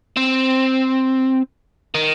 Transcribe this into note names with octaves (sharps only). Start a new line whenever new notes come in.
C4
D#3